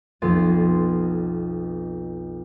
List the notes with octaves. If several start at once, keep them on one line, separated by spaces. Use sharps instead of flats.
B1 F2 B3 C4 C6 A6